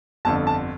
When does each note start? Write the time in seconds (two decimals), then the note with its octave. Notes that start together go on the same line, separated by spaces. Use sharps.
0.25 G1 F2 D3 A5
0.47 A5